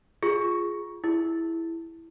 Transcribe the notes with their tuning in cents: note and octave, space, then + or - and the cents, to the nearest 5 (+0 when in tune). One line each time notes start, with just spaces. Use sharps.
F4 +0 G#4 +0 C#6 +0
E4 +0 G#4 +0